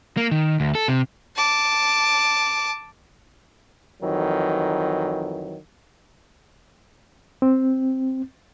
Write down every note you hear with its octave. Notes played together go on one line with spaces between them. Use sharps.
A#3
D#3
D2
A4
C3
A5 D6
F2 D#3 E3 F#3
C4